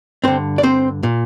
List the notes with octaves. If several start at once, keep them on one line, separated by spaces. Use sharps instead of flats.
G2 D3 C4 C5
D5
C4 C5
A#2